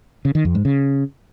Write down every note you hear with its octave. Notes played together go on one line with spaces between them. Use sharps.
C#3
D#3
F2
G#2
C#3